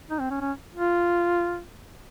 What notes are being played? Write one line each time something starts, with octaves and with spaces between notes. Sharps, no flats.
D#4
C4
C#4
C#4
F4